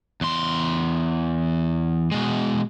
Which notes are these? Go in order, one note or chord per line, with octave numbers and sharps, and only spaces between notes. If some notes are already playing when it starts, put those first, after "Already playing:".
E2 C6
B2 G#3